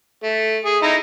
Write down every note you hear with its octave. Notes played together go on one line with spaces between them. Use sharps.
A3
G#4
D#4 E4 A#5